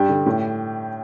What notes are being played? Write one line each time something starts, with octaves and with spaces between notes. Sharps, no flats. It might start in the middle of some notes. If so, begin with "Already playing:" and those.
Already playing: G2 G4
D3
A2